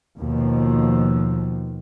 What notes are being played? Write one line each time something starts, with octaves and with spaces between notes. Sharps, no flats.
D#2 B2 F3